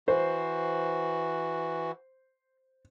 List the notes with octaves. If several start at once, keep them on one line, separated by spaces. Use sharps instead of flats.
E3 F#4 C5